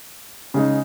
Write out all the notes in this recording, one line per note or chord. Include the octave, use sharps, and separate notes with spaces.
C#3 G#3 D#4